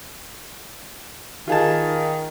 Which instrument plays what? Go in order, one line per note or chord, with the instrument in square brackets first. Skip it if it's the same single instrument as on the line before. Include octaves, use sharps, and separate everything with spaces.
[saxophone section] D#3 [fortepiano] F4 G#4 A5